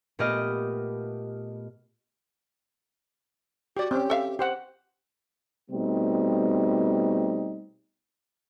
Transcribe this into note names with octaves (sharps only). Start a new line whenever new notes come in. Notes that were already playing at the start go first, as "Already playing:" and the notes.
A#2 A3 B3 G4 D#5 F6
F#4 G4 D5
C4 C#4 G4
A4 E5 F5
G4 C5 F#5
B2 G3 A3 C4 D#4